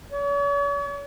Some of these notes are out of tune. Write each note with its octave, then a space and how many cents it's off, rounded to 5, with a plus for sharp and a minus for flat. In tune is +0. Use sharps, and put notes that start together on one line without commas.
C#5 +45